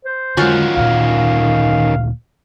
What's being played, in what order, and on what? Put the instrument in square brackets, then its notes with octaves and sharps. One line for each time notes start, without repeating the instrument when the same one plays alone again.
[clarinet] C5
[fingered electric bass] D3 G#3 [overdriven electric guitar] D#3 C#4 [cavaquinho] F4 F#4
[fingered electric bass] D2 A#2 [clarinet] F5